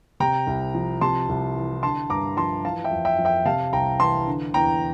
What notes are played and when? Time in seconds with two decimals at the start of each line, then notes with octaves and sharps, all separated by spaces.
0.20 C3 G5 A#5
0.47 C2
0.75 F3
1.01 C3 A5 C6
1.29 C2
1.56 E3
1.83 D3 A5 C6
2.10 G2 A#5 D6
2.37 F3 A5 C6
2.64 E3 F5 A5
2.84 E5 G5
2.91 F2
3.05 E5 G5
3.19 F2
3.25 E5 G5
3.45 C3 F5 A5
3.73 C2 G5 A#5
4.00 E3 A5 C6
4.27 D3
4.54 E2 G5 A#5